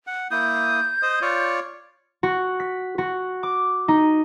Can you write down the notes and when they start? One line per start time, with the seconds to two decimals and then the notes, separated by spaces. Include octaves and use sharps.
0.07 F#5
0.31 A#3 E4 D#6 G6
1.02 C5 D#5 D#6
1.22 F4 C#5 D5
2.23 F#4
2.60 B6
2.98 F#4
3.43 D6
3.88 D#4